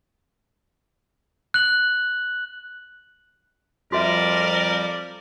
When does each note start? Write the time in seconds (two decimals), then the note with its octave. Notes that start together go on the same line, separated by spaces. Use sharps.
1.54 F#6 F#7
3.92 F2 G3 F#4 A#4 D5 E5 D6